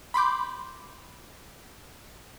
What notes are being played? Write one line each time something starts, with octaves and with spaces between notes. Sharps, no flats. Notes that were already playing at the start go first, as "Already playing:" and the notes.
B5 C6 D6 G6